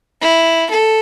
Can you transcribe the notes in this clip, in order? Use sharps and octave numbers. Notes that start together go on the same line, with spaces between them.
E4
A4